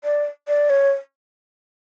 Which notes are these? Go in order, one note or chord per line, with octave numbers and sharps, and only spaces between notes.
D5
D5
C#5